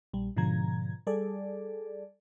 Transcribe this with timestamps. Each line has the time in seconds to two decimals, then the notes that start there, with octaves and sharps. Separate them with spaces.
0.13 A#1 G3
0.37 G#2 B2 D3 F3 A#5 G#6
1.07 G3 G#4 A4 D5